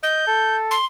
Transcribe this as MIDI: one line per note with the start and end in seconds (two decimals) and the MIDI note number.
0.03 0.22 75
0.03 0.56 91
0.27 0.75 69
0.71 0.85 84